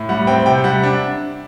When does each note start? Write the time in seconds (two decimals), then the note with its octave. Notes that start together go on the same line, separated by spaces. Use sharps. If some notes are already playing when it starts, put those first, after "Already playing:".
Already playing: A2
0.09 G3 F#5
0.27 C4 G5
0.46 C3 G5
0.64 G3 F#5
0.84 D4